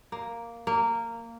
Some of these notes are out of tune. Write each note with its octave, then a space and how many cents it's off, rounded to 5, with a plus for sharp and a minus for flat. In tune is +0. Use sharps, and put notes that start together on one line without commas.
A#3 +0
A#3 -15